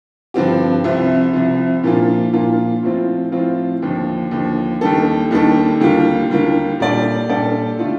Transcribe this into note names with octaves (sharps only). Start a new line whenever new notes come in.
G2 D3 F3 C4 G4
C2 C3 F3
C2 C3 F3
A#2 F3 A#3 D4 F4
A#2 F3 A#3 D4 F4
A2 F3 C4 F4
A2 F3 C4 F4
D#2 D3 F3
D#2 D3 F3
D#2 D#3 G3 D4 A4
D#2 D#3 G3 D4 A4
D#2 D3 G3 A#3 F4
D#2 D3 G3 A#3 F4
A#2 G3 D4 A4 D5
A#2 G3 D4 A4 D5
D3 A3 D4 F4